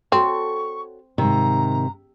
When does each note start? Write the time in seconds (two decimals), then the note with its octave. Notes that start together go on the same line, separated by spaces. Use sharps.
0.12 C4 F#4 A4 C#5 C#6
1.18 G#2 C3 D#3 A#5